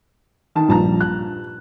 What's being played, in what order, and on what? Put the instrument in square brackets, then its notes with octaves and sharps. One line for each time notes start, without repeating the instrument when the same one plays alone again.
[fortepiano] D#3 A5
[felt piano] A#1 [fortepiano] G2 A5 A#5
[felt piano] F#6